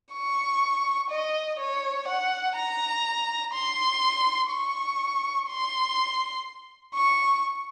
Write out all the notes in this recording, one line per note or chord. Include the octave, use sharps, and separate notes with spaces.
C#6
D#5
C#5
F#5
A#5
C6
C#6
C6
C#6